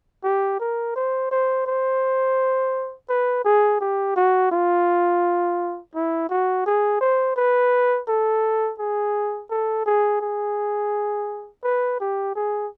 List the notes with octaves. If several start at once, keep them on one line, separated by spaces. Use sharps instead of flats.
G4
A#4
C5
C5
C5
B4
G#4
G4
F#4
F4
E4
F#4
G#4
C5
B4
A4
G#4
A4
G#4
G#4
B4
G4
G#4